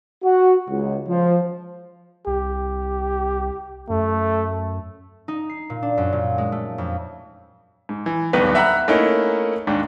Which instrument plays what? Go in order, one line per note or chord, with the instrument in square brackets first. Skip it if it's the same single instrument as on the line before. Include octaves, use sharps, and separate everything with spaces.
[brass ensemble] F#4
C#2
F3
[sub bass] C2 [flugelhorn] G4
[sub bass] F#2 [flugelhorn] A3
[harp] D#4
C7
A#2
D4
F#2
A#2
G#3
A3
F2
[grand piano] G#2
E3
D1 G1 D#2 B3 B4
E5 F#5 A#5 B5 F#6
A3 A#3 C#4 D#4 E4
D#2 G#2 D4